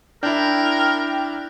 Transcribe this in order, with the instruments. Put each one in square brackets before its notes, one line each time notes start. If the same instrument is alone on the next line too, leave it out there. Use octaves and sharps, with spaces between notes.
[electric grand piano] D4 E4 [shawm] A#4 [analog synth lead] G5